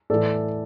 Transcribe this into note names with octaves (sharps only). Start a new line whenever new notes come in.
A2 E3 A4 D5